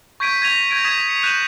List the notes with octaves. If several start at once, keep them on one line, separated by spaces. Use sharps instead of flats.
C#6 G6 G#6 B6 D7 D#7
C#6 G#6 A#6 D#7 F7
G6 G#6 A#6 D7
D#6 G#6 B6 E7 F7
C#7 F7
F#6 G6 B6 D#7 E7 F#7